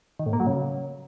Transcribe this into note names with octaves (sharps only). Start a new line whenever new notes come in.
D#3
A2
A#3
F#3
C#3